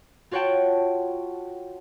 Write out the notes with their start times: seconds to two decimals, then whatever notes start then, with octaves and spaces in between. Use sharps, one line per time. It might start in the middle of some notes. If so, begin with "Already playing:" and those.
0.31 F4 F#4 C#5 F#5 G5 A5